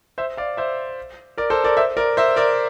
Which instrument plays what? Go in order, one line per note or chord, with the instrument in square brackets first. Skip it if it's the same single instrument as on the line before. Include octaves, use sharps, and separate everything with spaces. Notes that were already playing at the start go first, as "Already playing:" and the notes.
[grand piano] C5 E5
D5 F5
C5 E5
A#4 D5
A4 C5
A#4 D5
C5 E5
A#4 D5
C5 E5
A#4 D5